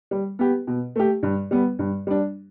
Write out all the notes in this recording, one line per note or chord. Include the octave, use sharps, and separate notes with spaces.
G3
B3 G4
B2
A3 G4
G2
G3 B3
G2
G3 D4